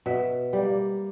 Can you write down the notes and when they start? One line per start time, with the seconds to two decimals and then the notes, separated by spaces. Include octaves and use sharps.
0.06 B2 E5
0.53 G3 A#3